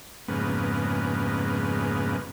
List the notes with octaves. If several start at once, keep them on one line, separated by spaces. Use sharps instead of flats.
F2 G#2 C#3 A#3 B3